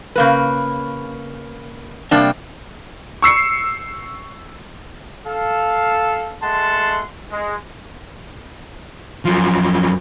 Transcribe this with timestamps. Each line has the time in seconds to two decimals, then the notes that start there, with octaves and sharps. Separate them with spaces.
0.16 C#3 A#3 B4
2.11 C3 G3 A#3 D4
3.22 C#6 E6 C7 C#7
5.26 A4 F5
6.43 G#3 A3 F#5 A5 C6
7.31 G#3
9.25 F#2 F3